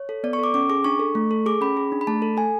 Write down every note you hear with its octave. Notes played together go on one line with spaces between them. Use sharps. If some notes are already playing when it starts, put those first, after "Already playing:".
Already playing: C#5
A4
B3 D5
C#6
A4 D6
C#4 D6
G#4 D6
D4 C#6
A4
A3
A4
G#4 D6
C#4 B5
G#4
D4
B5
A3 A5
A4
A4 G#5